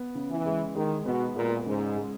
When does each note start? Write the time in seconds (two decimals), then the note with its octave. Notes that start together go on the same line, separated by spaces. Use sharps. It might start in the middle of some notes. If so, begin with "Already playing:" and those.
Already playing: B3
0.15 C#3
0.30 E3
0.46 G#3
0.75 D#3 G#3
1.05 B2 B3
1.36 A#2 G#3
1.66 G#2 C#3
1.96 G#3